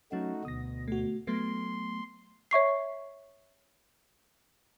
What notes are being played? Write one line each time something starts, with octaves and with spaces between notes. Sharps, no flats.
F#3 A3 C#4 D#4 F#4
D2 B2 D#6 A#6
A3 F#4
F#3 A3 B3 C6
C#5 E5 C#6 C7